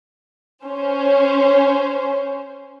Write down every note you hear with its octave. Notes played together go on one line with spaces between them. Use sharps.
C#4 C5